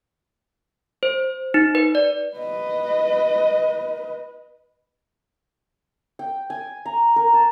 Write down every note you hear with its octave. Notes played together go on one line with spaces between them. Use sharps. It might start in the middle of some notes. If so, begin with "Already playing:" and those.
C5
D#4
B4
D5
B4 D#5
G5
G#5
A#5
A#4
A5